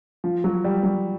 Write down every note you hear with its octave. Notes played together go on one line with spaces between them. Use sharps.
F3
F#3
G3
F#3